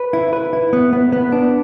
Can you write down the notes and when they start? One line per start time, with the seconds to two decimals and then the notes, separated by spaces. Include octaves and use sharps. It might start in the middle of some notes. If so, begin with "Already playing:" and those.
Already playing: B4
0.13 E4
0.33 B4
0.53 E4
0.73 B3
0.93 B3
1.12 B3
1.32 D4